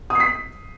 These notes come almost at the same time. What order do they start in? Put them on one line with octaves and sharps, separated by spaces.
D#6 C7 B6